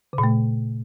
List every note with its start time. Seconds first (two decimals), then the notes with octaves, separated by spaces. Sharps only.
0.13 C#3
0.18 A#2
0.23 A3